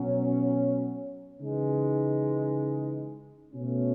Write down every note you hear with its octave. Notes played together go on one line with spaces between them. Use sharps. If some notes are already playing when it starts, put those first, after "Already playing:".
Already playing: B2 F#3 C#4
C#3 E3 G#3 D#4 G#4
B2 A3 C#4